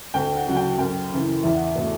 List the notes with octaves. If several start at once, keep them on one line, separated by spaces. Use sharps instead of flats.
D2 G5
F#5
C#3 F#3 F#5
G5
F#2 G5
C#3 E3
E2 E5
F#5
E5
B2 A3